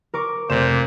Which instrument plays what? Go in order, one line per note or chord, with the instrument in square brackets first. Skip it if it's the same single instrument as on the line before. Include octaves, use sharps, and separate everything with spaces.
[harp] A#4 C#6 D6
[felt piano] F1 E7 [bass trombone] A#2 [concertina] C5